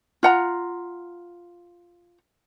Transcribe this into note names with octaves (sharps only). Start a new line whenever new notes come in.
F4 F#5 A#5